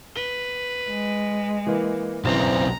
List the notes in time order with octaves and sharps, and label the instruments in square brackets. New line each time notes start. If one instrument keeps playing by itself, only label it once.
[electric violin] B4 [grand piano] G7
[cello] G#3
[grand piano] E3 A#3
[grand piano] F#1 E3 C5 [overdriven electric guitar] B1 C4 [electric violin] A#5